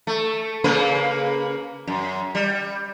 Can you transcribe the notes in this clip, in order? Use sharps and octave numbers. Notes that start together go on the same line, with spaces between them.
A3
C#3 A#3 B4
F#2
G3